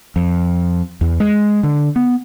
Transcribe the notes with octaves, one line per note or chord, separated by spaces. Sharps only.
F2
E2
G#3
D3
B3